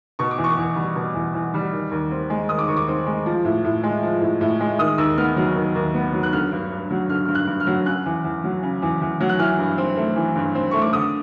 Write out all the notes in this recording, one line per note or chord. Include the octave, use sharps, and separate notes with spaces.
B2 C#6
D6
E2
C#6
E2
G3
B2
E2
E2
G3
D#3
D#2
C4
G#3
D#3 D#6
D6
D#2 C#6
D6
C4
G#3
F3
A2
A2
G#3
F3
A2
A2
G#3
D#3 D#6
D#2 E6
B3 F6
F#3 F6
D#3
D#2
B3
F#3
F#6
D3 F6
G2
G2
F#3
D3 F6
G2 F6
F#6
G2
F6
F#3
C#3 F#6
E2
E2
F#3
C#3
E2
E2
F#3
F#6
E3 F6
G2
C4
A3
E3
G2
C4
A3 C#6
D6
D3 D#6